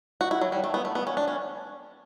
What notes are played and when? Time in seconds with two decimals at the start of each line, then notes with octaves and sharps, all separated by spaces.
0.21 F#4
0.31 E4
0.41 F#3
0.52 G3
0.64 A3
0.74 B3
0.85 A3
0.95 B3
1.07 C#4
1.17 D4
1.28 C#4